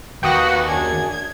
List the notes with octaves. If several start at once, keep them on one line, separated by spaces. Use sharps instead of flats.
D#2 A#3 F#4 B4 G5 D#6 A#6
F#2 D4 G#4 G#6